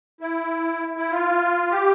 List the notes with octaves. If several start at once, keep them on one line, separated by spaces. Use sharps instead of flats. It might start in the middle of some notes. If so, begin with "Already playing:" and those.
E4
E4
F4
G4